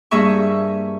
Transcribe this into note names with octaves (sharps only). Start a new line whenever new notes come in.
G2 A#3 G#4 E5 C#6